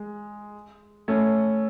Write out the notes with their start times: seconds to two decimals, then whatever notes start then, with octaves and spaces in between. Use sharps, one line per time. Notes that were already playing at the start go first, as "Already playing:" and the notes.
Already playing: G#3
1.08 A3 C#4